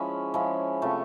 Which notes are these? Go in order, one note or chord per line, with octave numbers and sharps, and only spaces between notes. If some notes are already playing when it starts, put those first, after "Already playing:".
Already playing: F3 G#3 C#4 E4
F3 G#3 C#4 E4
C3 F3 A3